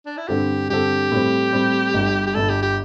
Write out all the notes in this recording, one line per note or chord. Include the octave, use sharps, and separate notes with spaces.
D4
E4
G2 D3 C4 G4 A4
G2 D3 C4 G4 A4
A2 G3 C4
A2 G3 C4
G1 G2 G3
G4
G1 G2 G3 A4
G4
G4